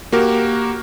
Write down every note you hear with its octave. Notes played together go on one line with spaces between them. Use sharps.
A#3 F#4 G4 A#4